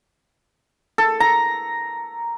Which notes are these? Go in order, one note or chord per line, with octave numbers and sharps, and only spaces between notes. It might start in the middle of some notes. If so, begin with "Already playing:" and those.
A4
A#5